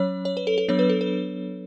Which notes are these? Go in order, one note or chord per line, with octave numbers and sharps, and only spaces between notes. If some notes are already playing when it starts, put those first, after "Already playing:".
Already playing: F#3 C#4 C#5
C#5
B4
A4
A4
F#3 B3 D4 C#5
B4
A4
B4